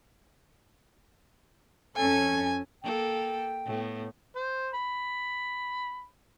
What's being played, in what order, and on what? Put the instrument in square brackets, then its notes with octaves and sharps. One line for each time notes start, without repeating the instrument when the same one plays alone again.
[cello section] F2 C#4 A4 [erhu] G#5
[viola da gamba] A#3 A4 [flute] G5
[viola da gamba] A2 B3
[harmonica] C5
B5